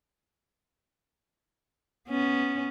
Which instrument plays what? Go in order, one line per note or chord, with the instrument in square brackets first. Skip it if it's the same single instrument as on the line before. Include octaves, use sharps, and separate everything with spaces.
[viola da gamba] B3 C#4